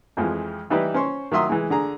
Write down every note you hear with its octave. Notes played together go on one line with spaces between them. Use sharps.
F2 E3 F3 G#3
E3 G3 D#4 E4 G4 B4
C#4 C5 C6 C#6
D#3 F#3 E5 C6 D#6
E3 G#3
D3 G#4 A#5